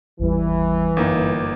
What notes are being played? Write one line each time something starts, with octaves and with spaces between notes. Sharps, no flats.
G#1 E2 E3 G3
G1 F#2 A#3 D#4